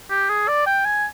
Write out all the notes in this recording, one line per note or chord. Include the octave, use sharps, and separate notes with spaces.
G4
G#4
D5
G5
G#5